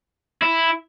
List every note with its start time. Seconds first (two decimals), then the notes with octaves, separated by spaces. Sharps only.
0.42 E4